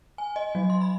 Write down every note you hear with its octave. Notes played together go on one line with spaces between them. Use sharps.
G#5
D#5
F#3
C6
B5